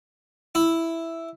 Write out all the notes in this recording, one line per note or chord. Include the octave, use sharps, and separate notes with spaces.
E4